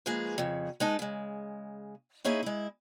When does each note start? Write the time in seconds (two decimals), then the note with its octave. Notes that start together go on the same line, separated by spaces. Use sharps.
0.06 F3 G#3 A#3 G#4 B4
0.38 F2 C#3
0.80 G#3 D#4 B4 A5
0.99 C#3 G#3
2.25 A#3 C#4 D#4 E4 G#4 E5
2.43 G#3 E4